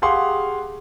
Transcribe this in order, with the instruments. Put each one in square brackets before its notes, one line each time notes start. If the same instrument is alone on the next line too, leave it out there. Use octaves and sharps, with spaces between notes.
[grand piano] G4 G#4 F5 F#5 C6 C#6